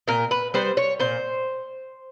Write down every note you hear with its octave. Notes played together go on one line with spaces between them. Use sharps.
A#2 A#4
B4
G3 B3 C5
C#5
A#2 C5